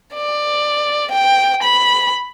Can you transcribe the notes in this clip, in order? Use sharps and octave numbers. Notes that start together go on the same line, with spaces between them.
D5
G5
B5